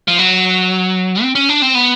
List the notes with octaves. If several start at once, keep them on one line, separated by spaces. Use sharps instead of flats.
F3
F#3
C4
C#4
D4
C4
B3